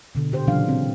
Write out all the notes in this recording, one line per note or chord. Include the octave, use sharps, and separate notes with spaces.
B2 D3
A#2 G4 C5
A#2 C#3 E3 F#3 D4 F5
C4